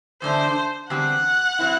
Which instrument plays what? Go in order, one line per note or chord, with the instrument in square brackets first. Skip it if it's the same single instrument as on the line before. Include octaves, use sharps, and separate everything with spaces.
[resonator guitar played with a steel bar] E2 D3 A3 D4 [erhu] C5
[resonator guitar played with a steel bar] E2 D3 G3 C4 G4 [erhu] F#5
[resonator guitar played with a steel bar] F#3 C4 E4